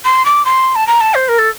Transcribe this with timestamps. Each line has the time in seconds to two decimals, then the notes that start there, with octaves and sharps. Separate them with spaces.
0.04 C6
0.25 D6
0.45 C6
0.75 A5
0.87 A#5
1.01 A5
1.14 C5
1.28 A#4
1.38 A4